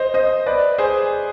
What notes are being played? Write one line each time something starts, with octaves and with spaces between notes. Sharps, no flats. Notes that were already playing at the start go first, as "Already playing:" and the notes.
Already playing: C5 D#5
C5 D#5
B4 D5
G#4 C5